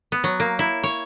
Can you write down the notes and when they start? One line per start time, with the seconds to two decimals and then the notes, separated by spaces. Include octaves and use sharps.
0.12 B3
0.24 F#3
0.40 A#3
0.59 E4
0.83 C#5